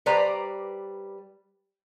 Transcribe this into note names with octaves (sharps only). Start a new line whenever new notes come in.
G3 B4 C5 D5 A#5